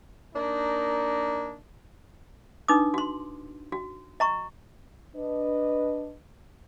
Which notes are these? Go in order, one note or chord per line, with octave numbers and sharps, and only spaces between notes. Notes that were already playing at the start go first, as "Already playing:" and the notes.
A#3 D4 D#4
D4 D#4 B4 D6 D#6
F#4 C6
F#4
D#5 A#5 C#6
D4 B4 D#5